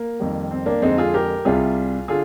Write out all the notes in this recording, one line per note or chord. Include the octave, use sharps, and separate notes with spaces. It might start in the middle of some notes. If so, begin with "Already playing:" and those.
Already playing: A#3
F2 D#3 G3
C4
A#3 D4
F2 D3 G#3 C4 D#4
F4 G#4
G4 A#4
C2 C3 G3 F4 G#4
D3 F4 G#4